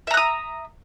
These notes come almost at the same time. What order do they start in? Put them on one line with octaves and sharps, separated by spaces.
E5 A#5 F#6 D#6